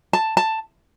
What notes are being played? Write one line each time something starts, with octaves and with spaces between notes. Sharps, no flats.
A5
A5